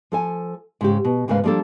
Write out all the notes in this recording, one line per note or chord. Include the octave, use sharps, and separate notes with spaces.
F3 A4 G#5
G#2 C#3 G4
B2
D2 G#2 C#3 A#3 B4 F5
F3 G3 A#3 D4 A4